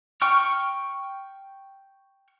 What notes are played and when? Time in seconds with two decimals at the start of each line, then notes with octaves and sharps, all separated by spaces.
0.22 G5 C#6 F6